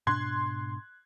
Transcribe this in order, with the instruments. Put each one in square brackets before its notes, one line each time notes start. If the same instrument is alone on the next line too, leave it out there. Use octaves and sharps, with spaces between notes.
[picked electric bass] G#2 B2 D4 [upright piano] C6 F#6 G#6